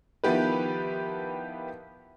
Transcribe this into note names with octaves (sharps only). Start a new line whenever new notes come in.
D#3 F3 B3 E4 G4 B4